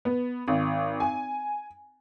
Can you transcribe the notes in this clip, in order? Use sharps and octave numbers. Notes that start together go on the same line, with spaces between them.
B3
G#1
G#5